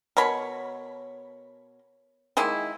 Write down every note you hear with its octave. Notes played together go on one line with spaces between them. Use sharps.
B2 A#4 C#5 B5
D#3 G#3 A#3 E4